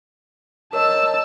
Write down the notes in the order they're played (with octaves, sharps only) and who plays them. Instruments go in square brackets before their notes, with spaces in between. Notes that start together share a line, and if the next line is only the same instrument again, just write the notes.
[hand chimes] A#4 C#5 D#5 [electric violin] A5 E6